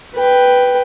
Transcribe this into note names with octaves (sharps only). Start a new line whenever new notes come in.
B4 G5